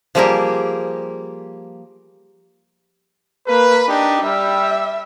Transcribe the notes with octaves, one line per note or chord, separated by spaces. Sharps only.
F3 G3 A#3 G4 G#4 A#4
A#3 B4
D4 D#4 G4
G3 E5